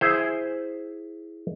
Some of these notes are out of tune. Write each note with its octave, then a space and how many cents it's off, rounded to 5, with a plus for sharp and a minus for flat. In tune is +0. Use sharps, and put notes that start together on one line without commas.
E4 +0 G#4 +0 C5 +0